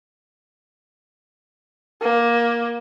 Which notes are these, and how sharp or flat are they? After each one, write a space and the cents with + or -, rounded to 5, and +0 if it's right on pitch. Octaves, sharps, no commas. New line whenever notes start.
A#3 +15